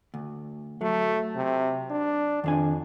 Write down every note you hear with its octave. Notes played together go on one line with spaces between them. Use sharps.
D2
F#3 A3
C3
D4
F2 D#3 D4 G#5